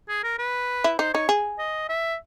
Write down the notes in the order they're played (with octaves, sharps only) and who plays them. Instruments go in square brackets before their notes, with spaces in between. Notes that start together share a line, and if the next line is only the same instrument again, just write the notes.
[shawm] G#4
A#4
B4
[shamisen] E4
[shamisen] D#4 [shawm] C5
[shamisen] D#4 [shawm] C#5
[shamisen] G#4
[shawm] D#5
E5